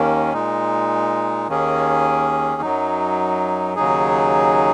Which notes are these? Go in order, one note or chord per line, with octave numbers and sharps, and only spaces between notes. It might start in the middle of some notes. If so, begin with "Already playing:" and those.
Already playing: D#2 D#3 A#3 C#4
A#2 G#3 D#4
D#2 D#3 A#3 C#4 G#4
F#2 F#3 D#4
D#2 C#3 F#3 D#4 G#4